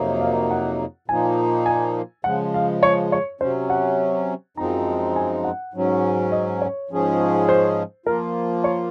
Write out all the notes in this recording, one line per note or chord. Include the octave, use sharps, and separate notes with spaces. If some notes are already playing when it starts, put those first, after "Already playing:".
Already playing: F2 C3 F#3 A#3 D#4
F5
F#5
A#2 F3 A#3 D#4 G#5
G#5
C#3 F3 G#3 F#5
F5
C#5
C#5
C3 F#3 C#4 C5
F#5
F#2 F3 G#3 C4 D#4 A#5
G#5
F#5
G#2 F#3 C#4
D#5
C#5
G#2 F3 G#3 C#4 G#4
C5
F3 A#3 F4 A#4
C#5